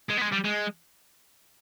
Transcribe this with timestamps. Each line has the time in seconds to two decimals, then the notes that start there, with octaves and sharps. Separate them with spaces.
0.10 G#3
0.18 B3
0.22 G#3
0.33 G3
0.45 G#3